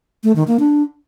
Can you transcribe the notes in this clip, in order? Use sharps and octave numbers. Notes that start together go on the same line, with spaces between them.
A3
D#3
A#3
D4